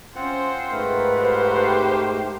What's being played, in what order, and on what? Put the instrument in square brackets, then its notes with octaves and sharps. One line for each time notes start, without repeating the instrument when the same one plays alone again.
[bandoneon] C4 F4 F#5 [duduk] C#4 [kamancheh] C5
[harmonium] G#2 A3 A#4 [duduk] B4
[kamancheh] G4 C5